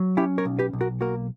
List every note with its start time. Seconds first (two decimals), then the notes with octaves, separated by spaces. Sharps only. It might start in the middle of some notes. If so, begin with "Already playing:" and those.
Already playing: F#3
0.17 C#4 E4 G4
0.38 A#4 C#5
0.45 B1
0.59 G4 B4
0.73 B1
0.81 F#4 A#4
1.01 A#3 F#4 A#4